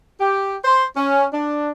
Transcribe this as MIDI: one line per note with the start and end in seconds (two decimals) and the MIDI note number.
0.20 0.56 67
0.65 0.84 72
0.96 1.26 61
1.32 1.70 62